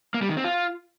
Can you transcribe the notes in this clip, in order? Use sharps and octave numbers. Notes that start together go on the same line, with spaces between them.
A#3
G3
D#3
C4
F4